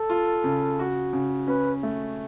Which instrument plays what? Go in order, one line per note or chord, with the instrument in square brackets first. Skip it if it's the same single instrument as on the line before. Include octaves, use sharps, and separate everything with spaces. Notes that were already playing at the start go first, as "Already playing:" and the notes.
Already playing: [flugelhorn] A4
[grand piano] F4
C#3
F#4
C#3
[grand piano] C#4 [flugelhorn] B4
[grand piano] A3